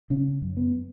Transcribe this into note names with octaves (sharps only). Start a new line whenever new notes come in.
C#3 C#4
F#2
B3